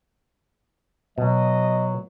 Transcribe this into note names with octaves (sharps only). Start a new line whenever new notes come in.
B2 F#3 D#5